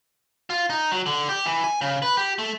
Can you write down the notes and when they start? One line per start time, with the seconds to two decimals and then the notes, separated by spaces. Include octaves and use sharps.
0.50 F4
0.70 D#4
0.92 F#3
1.06 D3
1.29 G4
1.45 E3
1.64 G#5
1.81 C#3
2.02 B4
2.17 G4
2.39 A3